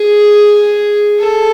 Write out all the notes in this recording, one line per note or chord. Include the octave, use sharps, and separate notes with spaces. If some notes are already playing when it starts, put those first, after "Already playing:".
Already playing: G#4
A4